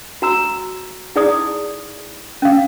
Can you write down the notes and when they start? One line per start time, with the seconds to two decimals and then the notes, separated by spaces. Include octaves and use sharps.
0.22 F#4 A#5 E6
1.16 D#4 E4 G#4 D5 D6 D#6
2.42 C#4 F5